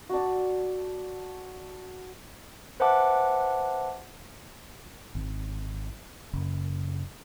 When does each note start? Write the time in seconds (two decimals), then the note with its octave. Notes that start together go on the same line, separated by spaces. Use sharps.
0.09 D4 F#4
2.80 B4 C5 E5 F#5 A5 D6
5.15 G#1
6.33 F#1